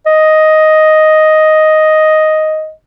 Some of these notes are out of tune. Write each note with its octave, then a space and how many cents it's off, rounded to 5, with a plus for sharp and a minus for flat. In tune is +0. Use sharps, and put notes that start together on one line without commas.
D#5 +5